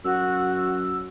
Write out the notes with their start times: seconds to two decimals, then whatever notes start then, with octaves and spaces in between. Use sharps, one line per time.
0.04 F#2 F#4 E6